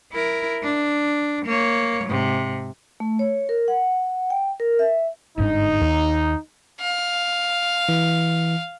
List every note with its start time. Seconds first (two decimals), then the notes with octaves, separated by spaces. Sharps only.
0.12 E4 A#4
0.63 D4
1.46 A#3 C#5
2.05 G#2 C3
3.00 A3
3.19 C#5
3.49 A#4
3.68 F#5
4.30 G5
4.60 A#4
4.79 E5
5.38 G1 G#2 D4 D#4
5.81 D#2
6.80 F5
7.89 E3